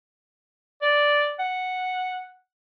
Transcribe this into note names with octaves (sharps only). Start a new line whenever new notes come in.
D5
F#5